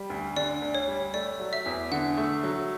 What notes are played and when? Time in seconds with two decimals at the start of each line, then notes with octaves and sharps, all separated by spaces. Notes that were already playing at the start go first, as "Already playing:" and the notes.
Already playing: G3
0.10 D2
0.36 D3 D5
0.62 D2
0.75 C#5
0.88 G3
1.14 A3 D5
1.40 F#3
1.53 E5
1.66 E2
1.91 D3 F#5
2.17 A3
2.44 F#3